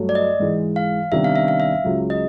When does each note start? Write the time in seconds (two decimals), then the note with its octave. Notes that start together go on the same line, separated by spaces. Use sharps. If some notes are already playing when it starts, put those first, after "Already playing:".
Already playing: G2 F#3 A3
0.09 D5
0.15 D#5
0.39 G#2 E3 G#3
0.76 F5
1.12 C3 D#3 G3 B3 D4 E5
1.24 F5
1.36 E5
1.48 F5
1.60 E5
1.84 C#2 C#3 F#3
2.10 D#5